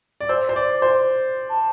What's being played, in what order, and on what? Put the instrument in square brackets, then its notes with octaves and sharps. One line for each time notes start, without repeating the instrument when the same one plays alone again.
[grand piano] D5
[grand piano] C5 [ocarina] E6
[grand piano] C5
[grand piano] D5 [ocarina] D6
[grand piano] C5 [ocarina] C6
[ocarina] A5